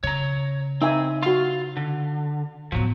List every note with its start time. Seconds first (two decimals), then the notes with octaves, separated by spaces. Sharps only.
0.04 C#3 C#5 A#5
0.82 C4 D#4 E5 G#5
1.23 F4 F#4 F5 C6
1.77 D3
2.72 A2 F3 F#3 B3